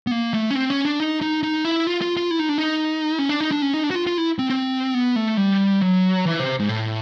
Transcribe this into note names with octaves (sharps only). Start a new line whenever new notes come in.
B3
A#3
A3
C#4
C4
C#4
D4
D#4
D#4
D#4
E4
F4
F4
F4
E4
D#4
D4
D#4
C#4
D4
D#4
D4
C#4
D#4
D4
F#4
F4
F4
E4
C4
C4
B3
A3
G3
F#3
E3
C3
G#2
A2